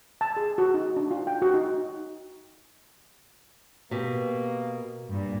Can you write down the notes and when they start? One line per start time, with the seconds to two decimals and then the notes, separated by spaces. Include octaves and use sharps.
0.21 A5
0.37 G#4
0.58 F#4
0.74 D#4
0.96 D4
1.11 F4
1.27 G5
1.42 F#4
1.54 D#4
3.91 B2 A#3 G4
5.09 G2 A#2